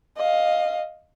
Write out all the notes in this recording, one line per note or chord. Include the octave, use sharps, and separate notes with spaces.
D#5 F5